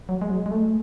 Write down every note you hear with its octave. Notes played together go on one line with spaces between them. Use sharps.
F#3
G#3
F#3
G#3
A3